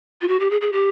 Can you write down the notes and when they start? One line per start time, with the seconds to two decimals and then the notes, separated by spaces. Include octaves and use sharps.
0.22 F4
0.28 F#4
0.40 G4
0.50 G#4
0.61 G#4
0.72 G4